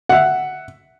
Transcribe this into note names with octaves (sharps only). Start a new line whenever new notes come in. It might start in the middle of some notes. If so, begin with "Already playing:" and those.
E5 F#5